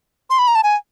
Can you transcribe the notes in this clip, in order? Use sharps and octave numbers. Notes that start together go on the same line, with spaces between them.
C6
B5
A#5
A5
G#5